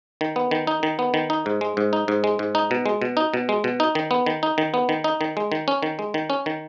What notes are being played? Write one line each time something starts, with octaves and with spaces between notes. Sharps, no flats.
D#3
B3
D#3
D#4
D#3
B3
D#3
D#4
G#2
G#3
G#2
D#4
G#2
G#3
G#2
D#4
B2
G#3
B2
D#4
B2
G#3
B2
D#4
D#3
B3
D#3
D#4
D#3
B3
D#3
D#4
D#3
G#3
D#3
C#4
D#3
G#3
D#3
C#4
D#3